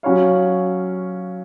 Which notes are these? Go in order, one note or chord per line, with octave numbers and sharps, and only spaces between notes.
F#3 C#4 F#4 C#5 F5